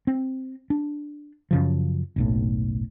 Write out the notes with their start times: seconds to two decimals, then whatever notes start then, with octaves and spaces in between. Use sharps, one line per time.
0.07 C4
0.70 D4
1.51 F#2 C#3 F3
2.16 F#1 B1 A2